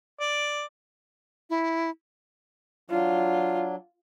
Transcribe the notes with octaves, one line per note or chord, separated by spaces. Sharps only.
D5
E4
F#3 D4 F4